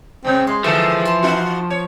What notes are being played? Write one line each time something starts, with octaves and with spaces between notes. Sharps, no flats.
G#2 C3 C4 C#5
G#3 C6
D3 E3 F3 G#3 F#4 A4 C#6
A5 C6
D#4 F4 F#4
C#5